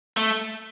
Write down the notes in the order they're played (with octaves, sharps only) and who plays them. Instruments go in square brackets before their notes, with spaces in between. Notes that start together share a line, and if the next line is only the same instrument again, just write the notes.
[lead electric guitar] A3